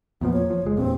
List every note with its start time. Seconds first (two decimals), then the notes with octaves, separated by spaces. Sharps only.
0.21 E2 A#2 F3 B3
0.34 C#5
0.50 F3
0.63 F#1 G#3
0.77 E2 G2 A#2 C4